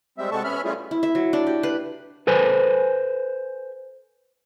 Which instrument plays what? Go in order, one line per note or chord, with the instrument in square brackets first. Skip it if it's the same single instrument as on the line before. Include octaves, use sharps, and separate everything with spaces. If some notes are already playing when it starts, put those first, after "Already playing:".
[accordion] G3 G#3 C4 E5
C3 G#3 F#4 A4 A5 C#6
B3 C#4 E5 B5 F6
G3 A3 C#4 E4 F4 G#4
[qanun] E4
E5
F#3
D4
G4
B4
[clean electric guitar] A4 B4 C5 G#5